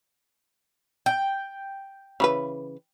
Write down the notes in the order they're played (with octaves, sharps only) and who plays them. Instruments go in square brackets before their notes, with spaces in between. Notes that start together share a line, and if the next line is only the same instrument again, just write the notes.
[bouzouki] G5
[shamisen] C#3 E3 B4